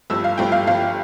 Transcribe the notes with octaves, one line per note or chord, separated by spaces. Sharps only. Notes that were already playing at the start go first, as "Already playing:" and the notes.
G1 G2 F3 E6
F5
G1 G2 F3 G5
F5
G1 G2 F3 F5